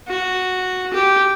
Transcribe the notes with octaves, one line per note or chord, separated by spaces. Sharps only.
F#4
G4